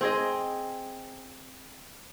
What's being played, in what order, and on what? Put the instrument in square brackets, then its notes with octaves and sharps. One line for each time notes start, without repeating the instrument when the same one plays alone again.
[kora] C4 G#4 D#5